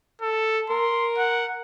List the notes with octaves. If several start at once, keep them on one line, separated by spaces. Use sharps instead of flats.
A4
A#4 C6
F#5